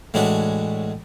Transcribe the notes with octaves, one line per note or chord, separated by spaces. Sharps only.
A2 E3 G#3 C#4 D4 F#4